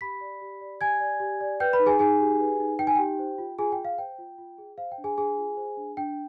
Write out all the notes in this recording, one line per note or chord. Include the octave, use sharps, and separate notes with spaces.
G4 B5 B6
D5
G4
D5
G4 G#5 G#6
D5
G4
D5
B4 G5 G6
B4 B5
D#4
G#4 G#5
D#4 G#4 G#5
G4
B4
D#4
D#4 G5
G#5
G4 G5
C5
F4
F4 G#4 G#5
G5
G#4
F5
C5 G5
F4
F4
G#4
C5 F5
G5
D4
G#4 G#5
D4 G#4 G#5
F4
C5
D4
D4 G5